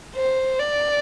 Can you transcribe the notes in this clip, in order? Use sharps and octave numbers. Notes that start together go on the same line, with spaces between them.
C5
D5